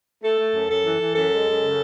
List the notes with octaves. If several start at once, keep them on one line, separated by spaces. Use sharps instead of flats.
A3 A4
A3
F#2
F#2 A4
E3
E3
F#2 A4
G#3
F#2
C#3